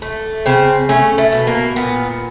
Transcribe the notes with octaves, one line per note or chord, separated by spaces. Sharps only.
A3
C#3 C4
A3 C#4
A3
B2
A#3
A#2 B3